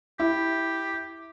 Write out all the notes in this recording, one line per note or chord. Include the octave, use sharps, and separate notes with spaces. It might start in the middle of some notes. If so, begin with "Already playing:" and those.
E4 G4